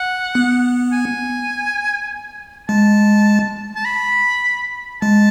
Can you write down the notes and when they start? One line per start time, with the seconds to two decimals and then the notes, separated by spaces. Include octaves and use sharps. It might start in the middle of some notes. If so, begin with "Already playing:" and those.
Already playing: F#5
0.35 B3
0.93 G#5
2.69 G#3 A5
3.76 A5
3.85 B5
5.02 G#3 A5